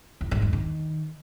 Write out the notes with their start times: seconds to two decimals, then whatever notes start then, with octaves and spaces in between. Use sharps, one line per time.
0.21 E2
0.31 G#2
0.42 E2
0.53 D#3